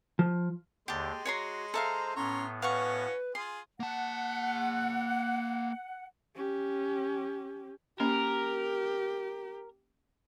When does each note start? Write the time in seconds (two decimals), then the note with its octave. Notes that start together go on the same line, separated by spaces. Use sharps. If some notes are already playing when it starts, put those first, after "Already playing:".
0.19 F3
0.88 D#2 D3 G#3 G4 A5
1.25 F#4 C#5 A#5 C6
1.74 A4 C5 E5 F5 A#5
2.16 A2 B3 C#4 C#5 A#5 C6
2.62 C#4 F#4 B4 F5 F#5 C#6
3.35 F4 G#4 C6
3.80 A#3 F#5 A5
6.35 C#4 G4
8.00 A#3 C#4 G4 A#4